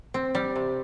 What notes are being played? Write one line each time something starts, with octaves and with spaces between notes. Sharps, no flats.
C4
G3
C3